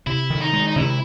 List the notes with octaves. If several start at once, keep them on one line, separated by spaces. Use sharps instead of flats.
C3 E4
D#3
D#4
G#3
D#4
C3 E4